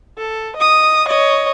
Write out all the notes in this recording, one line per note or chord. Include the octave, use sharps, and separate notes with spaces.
A4
D#5 D#6
C#5 D#5